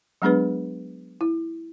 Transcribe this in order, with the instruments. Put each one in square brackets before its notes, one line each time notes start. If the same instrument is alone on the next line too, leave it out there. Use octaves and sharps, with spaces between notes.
[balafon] F#3 G#3 B3 D4 G#4 B4
E4